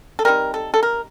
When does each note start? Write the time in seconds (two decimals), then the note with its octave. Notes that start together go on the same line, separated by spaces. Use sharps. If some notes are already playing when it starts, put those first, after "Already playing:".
0.19 A4
0.25 G3 C4 D#4 A#4
0.54 A4
0.74 A4
0.83 A#4